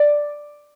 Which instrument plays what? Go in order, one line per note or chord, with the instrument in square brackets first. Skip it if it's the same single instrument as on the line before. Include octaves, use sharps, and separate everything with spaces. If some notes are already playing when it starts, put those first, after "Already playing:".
Already playing: [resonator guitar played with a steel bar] D5